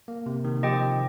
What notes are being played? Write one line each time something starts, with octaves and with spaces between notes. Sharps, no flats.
A#3
C3
D#3
F3 A#3 G4 D#5 G5